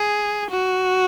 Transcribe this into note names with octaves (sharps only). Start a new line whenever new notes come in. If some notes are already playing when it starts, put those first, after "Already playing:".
Already playing: G#4
F#4